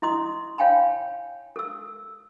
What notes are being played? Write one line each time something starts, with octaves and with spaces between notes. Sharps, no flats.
E4 D#5 C6 D#6
C#5 F5 G5 G#5 B5
A4 E6